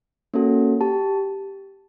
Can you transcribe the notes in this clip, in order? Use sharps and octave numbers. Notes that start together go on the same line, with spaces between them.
A#3 C#4 F#4 A4
G4 A5